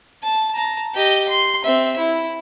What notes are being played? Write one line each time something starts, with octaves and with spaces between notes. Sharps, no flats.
A5
A5 A#5
G4 D#5
C6
C4 E5
E4